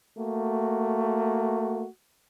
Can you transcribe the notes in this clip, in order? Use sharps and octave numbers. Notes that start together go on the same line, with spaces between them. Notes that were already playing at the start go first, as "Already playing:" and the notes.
A3 A#3 F#4